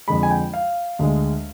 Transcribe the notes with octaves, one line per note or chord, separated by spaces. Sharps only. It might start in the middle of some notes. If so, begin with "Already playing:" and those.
F2 D3 G#3 B5
G#5
G5
F5
D2 D3 G#3